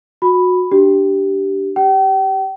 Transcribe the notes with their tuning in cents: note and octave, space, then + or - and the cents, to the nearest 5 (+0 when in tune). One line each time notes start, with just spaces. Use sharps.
F#4 -25 B5 +0
D4 +0 G4 -15
G4 +0 G5 -40